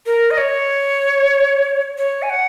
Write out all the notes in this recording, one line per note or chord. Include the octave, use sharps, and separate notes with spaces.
A#4
D#5
C#5
C#5
G#5
F#5